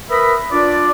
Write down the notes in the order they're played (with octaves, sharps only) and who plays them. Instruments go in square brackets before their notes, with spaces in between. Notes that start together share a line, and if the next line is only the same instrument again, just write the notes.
[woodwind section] A#4 B4 E5 B5 D#6
D4 F4 D5